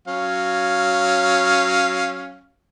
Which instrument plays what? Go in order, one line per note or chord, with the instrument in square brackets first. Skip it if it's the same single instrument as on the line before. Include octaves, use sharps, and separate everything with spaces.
[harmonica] F#3 C#4 F5